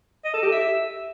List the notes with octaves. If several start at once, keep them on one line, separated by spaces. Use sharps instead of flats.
D#5
A4
G4
E5